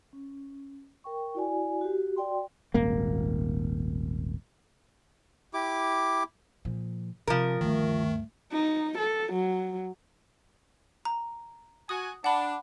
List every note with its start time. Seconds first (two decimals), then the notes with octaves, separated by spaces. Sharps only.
0.13 C#4
1.04 A#4 G5 C#6
1.35 E4 F#4 D5 G#5
1.81 F#4 G4
2.16 F#4 D5 G5 C6
2.74 D#1 G#1 A#3
5.54 E4 G4 D6
6.65 A#2 F3
7.27 C3 F3 A#4
7.61 D2 G2 D#3 A3
8.52 D#4
8.98 A4
9.33 F#3
11.05 A#5
11.89 F#4 G#5 D#6
12.24 D4 F#5 B5